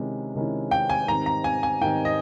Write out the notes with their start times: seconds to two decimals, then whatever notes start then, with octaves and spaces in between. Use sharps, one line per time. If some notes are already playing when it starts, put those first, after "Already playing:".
Already playing: C3 D#3 G#3 C#4 E4
0.35 C3 D#3 G#3 C#4 E4
0.71 G5
0.90 G#5
1.07 G#2 D#3 G3 C4 A#5
1.26 A#5
1.44 G#5
1.63 G#5
1.81 G#2 D#3 G3 C4 G5
2.05 D#5